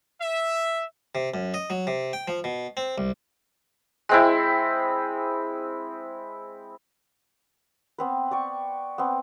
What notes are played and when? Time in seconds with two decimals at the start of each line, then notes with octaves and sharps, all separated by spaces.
0.21 E5
1.15 C3
1.34 F#2
1.54 D#5
1.70 F#3
1.87 C3
2.13 G5
2.28 F3
2.44 B2
2.77 C4
2.98 C2
4.09 G#3 C4 E4
7.98 B3 C4 B4
8.31 D5 G5 C#6
8.98 B3 C4